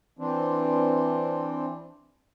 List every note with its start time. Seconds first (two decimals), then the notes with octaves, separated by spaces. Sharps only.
0.19 E3 C4 D4